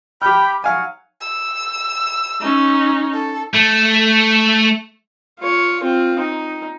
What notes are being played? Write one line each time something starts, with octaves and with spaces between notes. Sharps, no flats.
G4 G5 B5 F6
F#3 F5 F#5 G#5
E6
C#4 D#4
A4
A3
F4 C#5
C4 F4
D#4